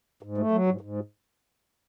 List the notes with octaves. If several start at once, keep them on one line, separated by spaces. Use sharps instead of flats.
G#2
A3
F#3
G#2
G#2